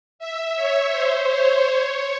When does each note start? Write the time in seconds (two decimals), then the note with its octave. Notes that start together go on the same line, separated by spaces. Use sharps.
0.19 E5
0.55 C#5
0.91 C5
1.27 C#5
1.64 C#5